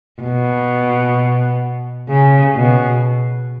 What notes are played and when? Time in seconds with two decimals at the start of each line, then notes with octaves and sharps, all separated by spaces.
0.22 B2
2.09 C#3
2.55 B2